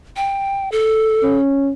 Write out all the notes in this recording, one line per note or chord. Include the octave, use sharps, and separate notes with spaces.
G5
A4
C#4